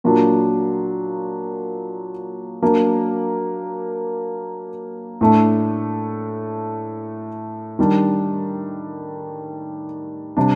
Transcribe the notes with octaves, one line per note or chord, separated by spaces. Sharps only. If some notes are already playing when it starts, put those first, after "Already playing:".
A#2 F#3 A#3 D4
F#3 A#3 D4
A2 A3 D4
D#3 G3 D4
C3 G3 D4